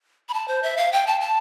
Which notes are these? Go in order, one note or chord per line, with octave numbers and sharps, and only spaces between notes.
B5
A5
C5
E5
F5
G5
A5
A5